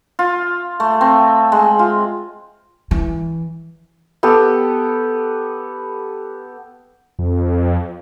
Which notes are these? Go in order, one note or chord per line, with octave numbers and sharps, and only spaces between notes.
F4
A3
C4
G#3
F4
E3
B3 G4 A4
F2